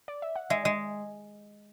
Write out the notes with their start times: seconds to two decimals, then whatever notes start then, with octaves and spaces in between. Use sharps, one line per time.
0.08 D5
0.22 E5
0.36 F#5
0.50 G#3 E5 G#5
0.65 G#3